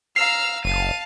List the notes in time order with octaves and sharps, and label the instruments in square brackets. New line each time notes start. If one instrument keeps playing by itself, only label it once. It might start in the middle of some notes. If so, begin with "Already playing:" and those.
[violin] F5 F6 [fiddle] A#5 E6 [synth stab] C7
[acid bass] F#1 [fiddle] F5 A5 [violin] D#7